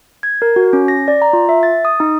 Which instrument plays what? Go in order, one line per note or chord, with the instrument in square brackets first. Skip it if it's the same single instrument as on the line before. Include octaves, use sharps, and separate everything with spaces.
[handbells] G#6
A#4
F#4
C#4
A#6
D5
A#5
F4
E5
A6
D#6
D#4